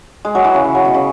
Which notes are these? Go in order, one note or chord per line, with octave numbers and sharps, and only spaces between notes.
G#3
F#3
E3
C#3
C#3
F#3
B2
C#3